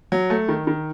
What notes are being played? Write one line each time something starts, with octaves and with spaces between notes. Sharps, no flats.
F#3
A3
D#3
D#3